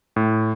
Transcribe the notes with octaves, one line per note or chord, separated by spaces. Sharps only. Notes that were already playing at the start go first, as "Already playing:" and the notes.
A2